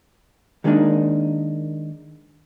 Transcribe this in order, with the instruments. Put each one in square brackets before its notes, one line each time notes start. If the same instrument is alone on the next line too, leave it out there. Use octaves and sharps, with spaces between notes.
[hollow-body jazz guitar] D#3 G3 G#3 A#3 D4 D#4